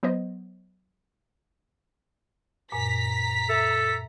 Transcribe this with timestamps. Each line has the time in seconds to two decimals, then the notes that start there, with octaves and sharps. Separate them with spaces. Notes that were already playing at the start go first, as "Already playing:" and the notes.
0.03 F#3 B3 C5 D#5
2.72 F#2 A#2 G#5 A#5 B6
3.49 A4 E5